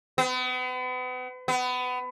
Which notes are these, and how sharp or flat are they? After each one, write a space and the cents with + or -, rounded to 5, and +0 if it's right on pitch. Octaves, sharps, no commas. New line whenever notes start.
B3 +40
B3 +25